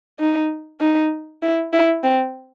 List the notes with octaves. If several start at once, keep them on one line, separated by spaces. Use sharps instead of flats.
D#4
D#4
E4
E4
C4